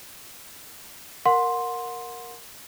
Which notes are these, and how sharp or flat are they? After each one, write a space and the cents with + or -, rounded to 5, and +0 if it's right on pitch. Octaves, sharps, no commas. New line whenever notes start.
A#4 +0 F#5 -30 C6 +5